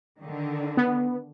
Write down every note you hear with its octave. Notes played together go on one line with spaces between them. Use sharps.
D3 D#3
B3